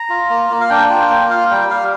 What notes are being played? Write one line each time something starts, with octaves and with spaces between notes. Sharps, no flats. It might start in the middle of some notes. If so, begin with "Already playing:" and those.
Already playing: A#5
F4
A#3
A#3
F5
D4 G5
F4 G5
A#3 G5
F4 F5
G3 G5
G3 F5